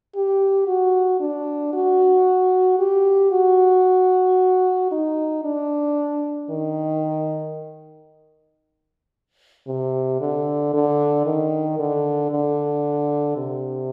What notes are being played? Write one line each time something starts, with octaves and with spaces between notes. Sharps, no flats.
G4
F#4
D4
F#4
G4
F#4
D#4
D4
D#3
C3
D3
D3
D#3
D3
D3
C3